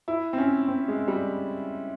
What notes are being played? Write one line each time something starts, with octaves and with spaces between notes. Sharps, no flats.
E4
C4
C#4
C4
G#3
G3